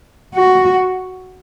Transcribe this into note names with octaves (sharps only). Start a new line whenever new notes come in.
F#4